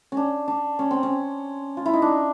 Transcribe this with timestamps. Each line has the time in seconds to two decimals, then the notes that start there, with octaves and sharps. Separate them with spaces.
0.12 C#4 D4
0.48 D4
0.79 C#4
0.91 C4
1.03 C#4
1.77 F4
1.86 E4
1.93 D#4
2.02 D4